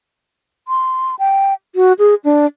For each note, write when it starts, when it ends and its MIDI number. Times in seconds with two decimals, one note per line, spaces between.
0.68 1.16 84
1.19 1.54 79
1.75 1.93 66
1.99 2.15 68
2.24 2.46 62